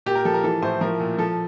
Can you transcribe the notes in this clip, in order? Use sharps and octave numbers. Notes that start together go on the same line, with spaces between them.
A#2 G4
A#4
F3 A4
A#4
E3 A4
A2 C5
F3 A#4
A#2
F3 A4